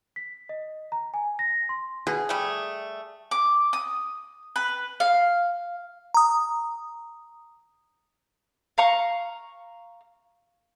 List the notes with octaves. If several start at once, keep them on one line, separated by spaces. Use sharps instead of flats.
B6
D#5
A#5
G#5
A#6
C6
B2 G#4
G3 A3
D6
D#6
B4
F5
A#5 D#6
F5 A#5 C#6